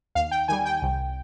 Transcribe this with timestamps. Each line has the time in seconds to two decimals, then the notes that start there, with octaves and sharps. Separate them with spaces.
0.15 D#2 F5
0.31 G5
0.48 D#3 G3 G#5
0.65 G5
0.82 C2